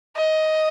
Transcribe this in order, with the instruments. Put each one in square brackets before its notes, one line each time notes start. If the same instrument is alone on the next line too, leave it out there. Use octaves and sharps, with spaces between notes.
[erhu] D#5